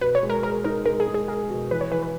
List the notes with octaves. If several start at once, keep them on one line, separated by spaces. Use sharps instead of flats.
B2 B4
C#5
G#3
A#4
G#4 A#4
D#4 A#4
G#3 A#4
G#4
G#3
G#4
G#4 A#4
B2
E3 B4
C#5
E3 B4
B4